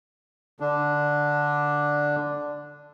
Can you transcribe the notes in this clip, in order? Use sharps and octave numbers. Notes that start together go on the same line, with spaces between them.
D3 D4